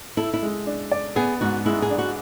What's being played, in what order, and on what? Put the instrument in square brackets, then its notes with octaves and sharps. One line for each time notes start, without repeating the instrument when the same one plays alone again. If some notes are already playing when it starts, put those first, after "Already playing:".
[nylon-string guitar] E4 [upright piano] A4
[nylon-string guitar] E4
[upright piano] G#3
D4
D5
[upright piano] B3 [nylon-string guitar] G#4
[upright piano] G#2 [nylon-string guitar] F#4
[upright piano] G#3 [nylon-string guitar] E4
[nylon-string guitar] G#4
[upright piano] D4
[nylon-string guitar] F#4